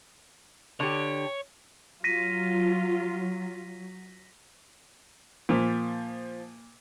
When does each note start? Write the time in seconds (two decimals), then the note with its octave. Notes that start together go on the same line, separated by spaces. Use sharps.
0.80 D3 G4 C#5
2.04 F#3 F4 A#6 B6 D#7
5.49 A#2 F3